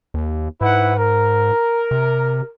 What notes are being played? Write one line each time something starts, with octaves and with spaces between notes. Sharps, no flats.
D#2
G#2 E4 B4 F#5
A#4
C3